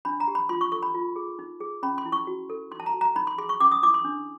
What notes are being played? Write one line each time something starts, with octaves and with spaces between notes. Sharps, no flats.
D4 B5
A#5
G4
B5
F4 C6
C#6
A4 C#6
B5
F4
G#4
D#4
G#4
C#4 B5
C6
E4
C#6
F#4
A4
D#4 C6
A5
A#5
F#4
A#5
D#4 B5
C6
G#4 C6
C#6
C#4 D6
D#6
E4 D6
C6
D4